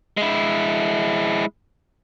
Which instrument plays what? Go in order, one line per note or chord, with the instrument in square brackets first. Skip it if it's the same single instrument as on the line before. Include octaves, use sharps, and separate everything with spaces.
[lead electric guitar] G#3 E4